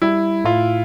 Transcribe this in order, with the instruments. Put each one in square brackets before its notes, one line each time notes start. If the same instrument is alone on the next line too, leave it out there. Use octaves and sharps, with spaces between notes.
[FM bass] G3 [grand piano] E4
[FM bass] A2 [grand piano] F4